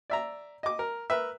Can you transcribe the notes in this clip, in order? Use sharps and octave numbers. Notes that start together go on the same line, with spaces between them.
D5 E5 A#5
D#5 D6
A#4
A#4 B4 E5